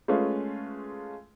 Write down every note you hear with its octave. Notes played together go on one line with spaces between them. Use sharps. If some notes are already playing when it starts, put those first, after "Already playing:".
G#3 A3 C#4 F4 B4